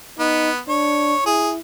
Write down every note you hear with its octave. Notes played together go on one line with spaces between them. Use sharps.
B3 D#4
D4 C#5
E4 G#4